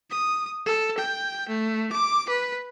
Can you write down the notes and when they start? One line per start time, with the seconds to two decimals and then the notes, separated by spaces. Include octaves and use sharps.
0.10 D#6
0.66 A4
0.98 G5
1.49 A3
1.92 D6
2.29 B4